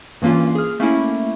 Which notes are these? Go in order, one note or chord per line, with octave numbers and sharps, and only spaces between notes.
G2 E3 A#3 C#4 F4
G#4 F6
A3 A#3 C#4 E4